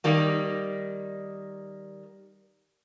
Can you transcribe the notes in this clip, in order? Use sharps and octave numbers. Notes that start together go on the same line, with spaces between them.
D#3 G3 A#3